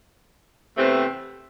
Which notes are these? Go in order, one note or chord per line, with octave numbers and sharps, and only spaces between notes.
E2 C3 E3 A3 C4